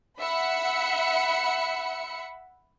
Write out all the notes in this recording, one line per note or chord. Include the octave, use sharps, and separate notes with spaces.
E5 F#5 B5 C#7